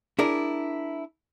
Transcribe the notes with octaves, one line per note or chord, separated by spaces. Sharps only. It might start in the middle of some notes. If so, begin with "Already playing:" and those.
D4 E4 G#4 A#4